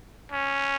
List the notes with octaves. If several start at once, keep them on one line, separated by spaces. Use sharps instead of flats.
C#4